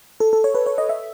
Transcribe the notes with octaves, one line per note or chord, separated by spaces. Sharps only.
A4
A4
C#5
B4
C#5
D#5
E5